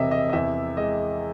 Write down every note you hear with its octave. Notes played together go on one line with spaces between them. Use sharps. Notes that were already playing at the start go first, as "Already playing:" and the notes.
Already playing: E1 C3 D#5 E5
D#5
D#5
E2 E5
G#3 D#5